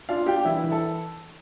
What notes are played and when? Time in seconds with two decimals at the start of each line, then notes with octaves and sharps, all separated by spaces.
0.09 D4 F4 F5
0.26 D4 G4 G5
0.45 E3 E4 E5
0.63 E3
0.72 A4